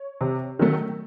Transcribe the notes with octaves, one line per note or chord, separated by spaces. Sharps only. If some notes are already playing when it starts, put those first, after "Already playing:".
Already playing: C#5
C3
D#3 F#3 A3